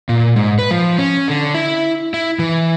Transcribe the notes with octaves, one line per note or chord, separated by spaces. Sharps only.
A#2
G#2
B4
F3
C#4
D3
E4
E4
E3